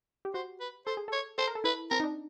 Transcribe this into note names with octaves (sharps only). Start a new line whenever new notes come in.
G4
F#4 C5
B4
A4 C5
G#4
A4 C#5
A4 C5
A#4
A4
E4 B4
C4 A#4
D#4
D4